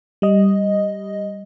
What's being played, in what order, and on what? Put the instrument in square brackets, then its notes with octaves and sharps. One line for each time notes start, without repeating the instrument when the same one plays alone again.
[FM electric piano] G3 D#5